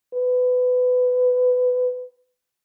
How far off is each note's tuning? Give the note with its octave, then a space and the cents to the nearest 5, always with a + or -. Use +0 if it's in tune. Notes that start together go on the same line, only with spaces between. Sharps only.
B4 +20